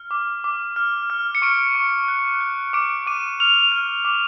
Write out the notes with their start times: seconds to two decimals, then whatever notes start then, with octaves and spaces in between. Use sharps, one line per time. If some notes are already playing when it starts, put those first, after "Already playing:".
Already playing: F6
0.11 D6
0.44 D6
0.76 F6
1.10 F6
1.35 C#7
1.42 C#6 D7
1.75 C#6
2.08 F#6
2.40 F#6
2.73 D6 D7
3.07 D6 D#7
3.40 F6 F7
3.72 F6
4.05 D6